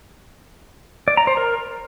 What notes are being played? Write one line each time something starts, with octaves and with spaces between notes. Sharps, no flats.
D5
A#5
C5
A#4